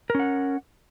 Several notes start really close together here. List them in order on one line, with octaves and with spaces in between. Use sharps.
A#4 C#4 F#5